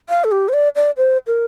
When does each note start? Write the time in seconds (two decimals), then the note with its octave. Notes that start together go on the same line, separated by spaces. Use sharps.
0.09 F5
0.24 A4
0.31 G4
0.48 C5
0.53 D5
0.76 D5
0.97 C5
1.27 A#4